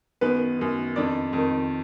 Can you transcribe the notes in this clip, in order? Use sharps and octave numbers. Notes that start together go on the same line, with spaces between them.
F#2 D#3 B3 B4
F#2 D#3
F2 D#3 D4 D5
F2 D#3